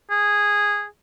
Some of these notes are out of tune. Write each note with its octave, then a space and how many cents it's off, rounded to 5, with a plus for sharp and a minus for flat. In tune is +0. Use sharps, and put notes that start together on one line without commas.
G#4 -10